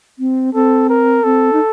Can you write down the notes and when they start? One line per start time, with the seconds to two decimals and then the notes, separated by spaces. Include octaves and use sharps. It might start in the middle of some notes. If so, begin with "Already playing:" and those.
0.19 C4
0.54 C4 A4
0.89 A#4
1.24 C4 A4
1.52 D#4